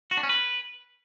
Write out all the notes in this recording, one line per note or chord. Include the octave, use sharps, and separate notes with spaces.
F#4
D4
C#4
B4